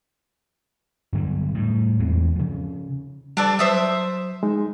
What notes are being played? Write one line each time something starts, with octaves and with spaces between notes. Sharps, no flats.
G2 D3 F#3 G3
A2 G3
E2 E3 G#3 C4
C#3 F3
G3 D4 A4 D5
F#3 C5 E5 D#6
G#3 D#4